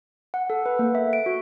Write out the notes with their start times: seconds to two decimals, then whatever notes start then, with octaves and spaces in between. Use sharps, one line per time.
0.34 F#5
0.50 A4
0.66 B4
0.79 A#3
0.95 E5
1.13 D7
1.26 F#4